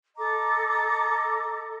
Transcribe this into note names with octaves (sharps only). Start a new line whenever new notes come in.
A4 D#5 A#5 D6